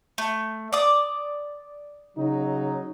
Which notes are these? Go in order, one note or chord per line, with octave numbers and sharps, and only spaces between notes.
A3
D5 D#6
C#3 F#3 D#4